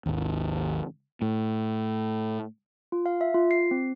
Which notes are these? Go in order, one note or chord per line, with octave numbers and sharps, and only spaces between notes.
G#1 D#2
A2
F4
F5
E5
F4
C7
C4